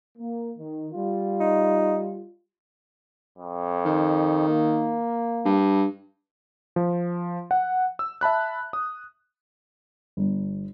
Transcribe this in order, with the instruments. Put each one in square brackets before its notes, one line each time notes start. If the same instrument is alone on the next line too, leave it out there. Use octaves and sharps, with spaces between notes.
[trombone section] A#3
D#3
G3 F4
[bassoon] D#4
[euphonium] F2
[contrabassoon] D#3
[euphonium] A#3
[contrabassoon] G2
[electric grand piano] F3
F#5
E6
E5 A5 B5 F#6
D#6
[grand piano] G1